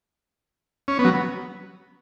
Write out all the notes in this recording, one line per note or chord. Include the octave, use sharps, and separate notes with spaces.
C#4
B3
F#3